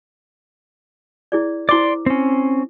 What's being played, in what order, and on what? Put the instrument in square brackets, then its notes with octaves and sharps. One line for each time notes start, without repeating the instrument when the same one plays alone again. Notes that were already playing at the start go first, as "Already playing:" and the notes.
[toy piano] E4 G#4 D5
[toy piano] E4 C5 D6 [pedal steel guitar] D5 C6
[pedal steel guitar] C4 C#4